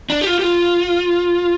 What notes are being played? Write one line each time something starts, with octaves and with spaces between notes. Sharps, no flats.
D4
G4
F4
G4
F4